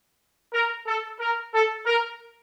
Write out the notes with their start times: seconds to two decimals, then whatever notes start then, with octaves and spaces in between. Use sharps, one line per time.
0.53 A#4
0.87 A4
1.20 A#4
1.54 A4
1.86 A#4